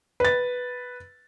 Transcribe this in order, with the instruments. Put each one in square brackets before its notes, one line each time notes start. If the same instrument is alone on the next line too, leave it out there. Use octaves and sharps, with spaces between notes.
[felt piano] B4 A6